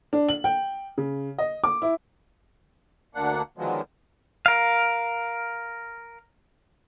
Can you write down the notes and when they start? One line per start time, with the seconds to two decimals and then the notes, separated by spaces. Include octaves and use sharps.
0.13 D4
0.29 F#7
0.44 G5
0.98 C#3
1.38 D#5
1.64 D6
1.82 E4
3.15 D2 A#3 D4 F#5
3.58 D3 D#3 F3 F#3 G#3 B3
4.46 A#4 F5